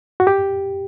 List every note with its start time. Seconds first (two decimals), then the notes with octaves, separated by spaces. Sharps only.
0.20 F#4
0.27 G4